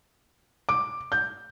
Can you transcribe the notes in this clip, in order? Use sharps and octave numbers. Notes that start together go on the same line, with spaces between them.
D6
G6